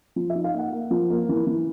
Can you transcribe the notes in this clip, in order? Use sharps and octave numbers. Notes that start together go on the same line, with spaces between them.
F3
E5
D#4
F5
A#3
F#5
A#3
F3
A#3
E3
E3